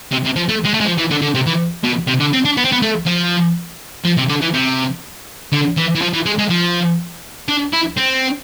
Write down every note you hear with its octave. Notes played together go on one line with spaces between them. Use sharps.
C3
C3
F3
A3
G#3
A3
G#3
F3
E3
D3
D3
C3
E3
B2
C3
D3
C4
D4
B3
C4
B3
A3
F3
F3
C3
D3
E3
C3
D3
E3
E3
F3
E3
G#3
G#3
F3
D4
E4
C4